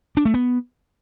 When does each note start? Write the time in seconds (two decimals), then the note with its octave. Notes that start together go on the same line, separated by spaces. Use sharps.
0.17 D4
0.25 A3
0.34 B3